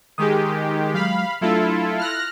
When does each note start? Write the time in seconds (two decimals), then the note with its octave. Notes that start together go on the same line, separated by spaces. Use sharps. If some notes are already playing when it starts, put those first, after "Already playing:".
0.18 D#3 G#3 G4 G#4 D#6
0.94 F#3 G#3 F5 B5
1.41 F#3 A3 D4 E4 F4 A4
1.99 F6 F#6 A#6